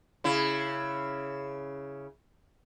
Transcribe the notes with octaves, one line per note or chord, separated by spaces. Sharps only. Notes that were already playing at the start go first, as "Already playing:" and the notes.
C#3 E4